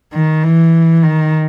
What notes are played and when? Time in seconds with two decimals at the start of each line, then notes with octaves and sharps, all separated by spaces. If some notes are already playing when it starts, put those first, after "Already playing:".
0.14 D#3
0.43 E3
1.03 D#3